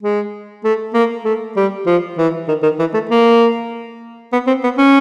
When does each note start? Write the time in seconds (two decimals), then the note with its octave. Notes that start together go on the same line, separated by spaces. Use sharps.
0.03 G#3
0.64 A3
0.94 A#3
1.24 A3
1.56 G3
1.86 F3
2.18 E3
2.48 D#3
2.63 D#3
2.79 E3
2.93 A3
3.10 A#3
4.32 B3
4.47 C4
4.64 B3
4.78 C#4